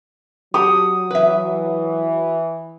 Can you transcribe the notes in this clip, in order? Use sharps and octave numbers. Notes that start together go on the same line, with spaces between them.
F#3 G4 F#5 A5 D#6
E3 B4 E5